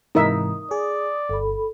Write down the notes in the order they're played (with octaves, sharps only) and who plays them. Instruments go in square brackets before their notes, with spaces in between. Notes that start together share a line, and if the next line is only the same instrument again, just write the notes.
[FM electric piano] G#2 C3 E3 [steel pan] D#4 A#4 E5 [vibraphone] D#6
[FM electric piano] G#4 [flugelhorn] D5
[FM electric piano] G1 [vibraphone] A4 B5